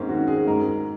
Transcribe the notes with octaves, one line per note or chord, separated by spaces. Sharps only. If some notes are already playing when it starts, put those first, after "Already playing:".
Already playing: G#2 A#3 C4 C#4
D#3 F#4
G#4
G#2 A#4